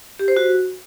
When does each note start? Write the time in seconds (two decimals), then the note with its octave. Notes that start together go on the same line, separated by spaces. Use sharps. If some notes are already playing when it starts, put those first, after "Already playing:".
0.19 G4
0.28 C5
0.37 F#4